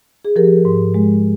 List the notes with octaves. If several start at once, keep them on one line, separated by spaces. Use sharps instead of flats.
G#4
F3 G4 A#4
G#2
G#3